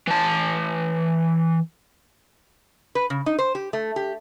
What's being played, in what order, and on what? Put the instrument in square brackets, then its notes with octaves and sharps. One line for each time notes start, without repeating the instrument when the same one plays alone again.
[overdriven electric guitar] E3 A5
[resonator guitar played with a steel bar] B4
C#3
D#4
C5
G4
A3
G4